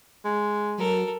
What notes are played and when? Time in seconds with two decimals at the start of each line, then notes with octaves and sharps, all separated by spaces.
0.25 G#3
0.78 F#3 A4 A#4